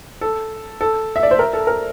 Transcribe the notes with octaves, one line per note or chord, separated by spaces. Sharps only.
A4
A4
E5
D5
C5
A#4
A4
A#4